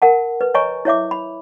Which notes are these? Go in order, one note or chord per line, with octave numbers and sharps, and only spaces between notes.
A#4 F#5 A5
B4
C#5 D#5 G#5 A#5 C#6
E4 C#5 E5 D6
B5